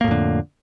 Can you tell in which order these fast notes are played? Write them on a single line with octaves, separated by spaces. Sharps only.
A#3 A2 F2 D3